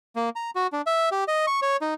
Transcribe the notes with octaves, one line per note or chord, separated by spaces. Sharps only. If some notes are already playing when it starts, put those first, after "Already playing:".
A#3
A#5
F#4
D4
E5
G4
D#5
C#6
C#5
D#4